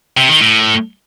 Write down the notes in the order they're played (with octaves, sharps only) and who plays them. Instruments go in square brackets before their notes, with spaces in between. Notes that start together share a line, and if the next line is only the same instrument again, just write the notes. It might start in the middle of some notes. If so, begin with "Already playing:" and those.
[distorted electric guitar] C3
D#3
A2